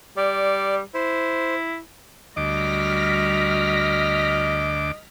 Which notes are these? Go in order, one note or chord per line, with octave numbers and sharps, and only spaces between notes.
G3 D5
E4 C5
D2 G3 F#4 D#5 D6 F6 A#6 B6